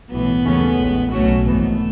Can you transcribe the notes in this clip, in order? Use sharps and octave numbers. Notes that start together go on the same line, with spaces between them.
B1 A2 E3 B3
D#2 C#3 E3 A3 C#4
A1 A2 G#3
B1 B2 F#3 A3 C#4 F#4
G#1 G#2 E3 A3 B3